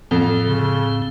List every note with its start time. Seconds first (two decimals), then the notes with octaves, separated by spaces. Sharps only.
0.11 F2 A2 C4
0.46 C#3